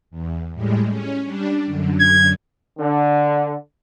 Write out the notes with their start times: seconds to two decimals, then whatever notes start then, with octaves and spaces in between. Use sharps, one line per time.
0.10 E2
0.54 A2 G3 G#3
0.88 C#4
1.25 G3 D4
1.66 F#2 D3
2.00 G#6
2.79 D3